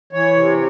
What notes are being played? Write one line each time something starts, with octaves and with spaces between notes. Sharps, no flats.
E3 C#5
C3